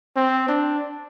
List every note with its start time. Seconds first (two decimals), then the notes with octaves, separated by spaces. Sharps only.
0.16 C4
0.48 D4